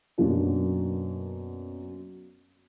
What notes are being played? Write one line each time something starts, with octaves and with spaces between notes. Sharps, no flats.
F#2 B2 F#3 A#3 D4